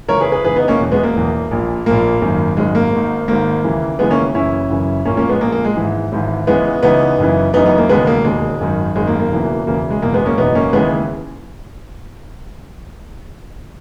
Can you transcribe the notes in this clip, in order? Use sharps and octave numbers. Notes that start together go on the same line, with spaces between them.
C#2 C#3 E3 A#4 C#5
G#4 B4
G#4 B4
C#2 C#3 E3 G#4 B4
B3 D#4
A#3 C#4
E1 E2 B2
G#3 B3
A#3
E1 E2 B2
A#1 A#2
A#1 A#2 A#3
G#1 F#2 D#3
G#1 F#2 D#3 G#3
A#3
G#1 G#2 D#3
G#1 G#2 D#3 A#3
D#2 C#3 E3
D#2 C#3 E3 G#3 B3
A#3 C#4
F#1 F#2 C#3 E3 C#4 E4
F#1 F#2 C#3 E3
A#1 A#2 A#3 C#4
A#3 C#4
G#3 B3
A#1 A#2 A#3
A#3
G#3
G#1 G#2 E3
G#1 G#2 E3
C#2 C#3 E3 G#3 B3
C#2 C#3 E3 B3 D#4
F#1 F#2 C#3 E3
F#1 F#2 C#3 E3 B3 D#4
B3 D#4
A#3
E1 D#2 C#3 G#3 B3
A#3
E1 D#2 C#3 G#3
G#1 F#2 D#3
G#1 F#2 D#3 G#3
A#3
A#3
E1 E2 C#3 E3
E1 E2 C#3 E3 A#3
G#3
F#1 E2 B2 A#3
G#3 B3
A#3 C#4
F#1 E2 B2 B3 D#4
A#3 C#4
D#2 C#3 E3 G#3 B3